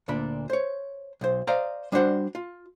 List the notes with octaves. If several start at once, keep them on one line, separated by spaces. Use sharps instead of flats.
D2 A#2 D4 B5
C5 C#5
B1 C5
C5 D5 D#5 F5 A#5
G3 D4 F#4 C5 F#5
F4